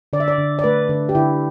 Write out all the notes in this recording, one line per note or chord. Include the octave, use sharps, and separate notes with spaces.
D3 D5
E5
D5
D3
D5
A3 B4
D3
G4
D3 E4